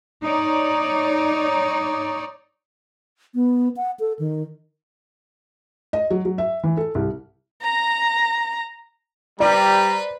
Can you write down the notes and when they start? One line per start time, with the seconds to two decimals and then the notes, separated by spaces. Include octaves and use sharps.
0.24 D#4 C#5 D5
3.35 B3
3.77 F#5
4.00 A4
4.19 D#3
5.93 D#5
6.10 F#3
6.25 F#3
6.38 E5
6.63 E3
6.77 A4
6.95 C2
7.61 A#5 A#6
9.40 G3 B4 C5 D5 A#5